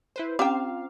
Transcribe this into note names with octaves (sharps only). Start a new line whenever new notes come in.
E4 B4 C5
C4 C#4 F4 G4 F5 G5 A#5 D6